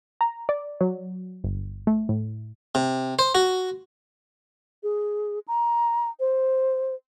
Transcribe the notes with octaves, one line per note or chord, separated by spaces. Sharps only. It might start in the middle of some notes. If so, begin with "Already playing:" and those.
A#5
D5
F#3
G1
A3
A2
C3
C5
F#4
G#4
A#5
C5